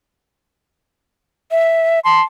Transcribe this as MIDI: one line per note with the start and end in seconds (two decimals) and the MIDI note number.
1.51 1.99 76
2.05 2.22 81
2.05 2.22 84